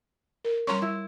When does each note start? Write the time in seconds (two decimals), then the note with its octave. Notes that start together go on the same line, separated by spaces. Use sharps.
0.44 A#4
0.67 G3 C#4 A#5 C6 C#6
0.82 E4